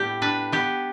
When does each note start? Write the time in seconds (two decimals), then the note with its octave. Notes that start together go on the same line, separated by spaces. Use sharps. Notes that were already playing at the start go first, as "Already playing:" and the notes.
Already playing: A2 G3 B3 G4
0.22 D4 B4
0.52 B3 G4